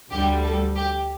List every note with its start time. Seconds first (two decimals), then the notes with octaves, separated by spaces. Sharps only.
0.11 D2 D3 G3 G4
0.44 A4
0.77 G4